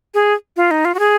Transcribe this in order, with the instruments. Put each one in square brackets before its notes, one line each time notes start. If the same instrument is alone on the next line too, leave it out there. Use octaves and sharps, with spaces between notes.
[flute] G#4
F4
D#4
F4
F#4
G#4